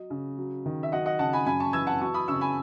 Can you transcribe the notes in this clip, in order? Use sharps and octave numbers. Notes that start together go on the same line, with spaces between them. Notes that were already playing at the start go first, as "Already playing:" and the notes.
Already playing: F#3 D#5
C#3
F#3
D#3
E5
F#3 D#5 F#5
D#5 F#5
C#3 F#5 A5
G#5 B5
F#2 G#5 B5
A5 C#6
E3 E6 G#6
F#5 A5
F#3 A5 C#6
B5 D#6
C#3 C#6 E6
G#5 B5